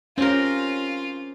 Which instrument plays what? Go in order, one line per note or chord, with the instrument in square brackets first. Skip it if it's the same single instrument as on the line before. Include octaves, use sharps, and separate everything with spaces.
[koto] C4 G4 A#4 [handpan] C#4 [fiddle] F4